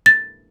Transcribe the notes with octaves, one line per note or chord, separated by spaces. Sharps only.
A6